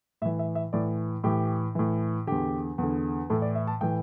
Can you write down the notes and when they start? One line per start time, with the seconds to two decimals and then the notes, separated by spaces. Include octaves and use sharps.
0.22 A2 E5
0.25 E3
0.39 E5
0.55 E5
0.73 A2 E3 D5
1.24 A2 E3 G4
1.75 A2 E3
2.27 E2 D3 G4
2.78 E2 D3
3.30 A2 E3 A4
3.42 D5
3.55 E5
3.67 A5
3.81 A2 E3 G5